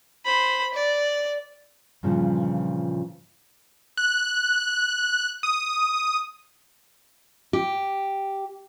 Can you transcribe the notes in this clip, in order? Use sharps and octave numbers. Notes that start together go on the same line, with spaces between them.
C5 B5
D5
G2 A#2 C#3 E3 F3
F#6
D#6
G4